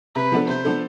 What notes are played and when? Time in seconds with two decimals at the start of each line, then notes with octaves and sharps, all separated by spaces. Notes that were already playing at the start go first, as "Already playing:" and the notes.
0.16 C3 B4
0.32 F3 B3 D4 A4
0.48 C3 C5
0.65 F3 B3 D4 A4